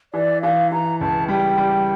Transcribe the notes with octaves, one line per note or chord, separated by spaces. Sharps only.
E3 D5
E3 F5
E3 A#5
C#2 A5
G3 G5
G3